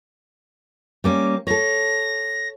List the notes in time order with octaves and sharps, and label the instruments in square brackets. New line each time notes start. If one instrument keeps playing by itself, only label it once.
[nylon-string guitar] G3 A#3 C#4 [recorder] D6
[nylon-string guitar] A4 C#5 [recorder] A#6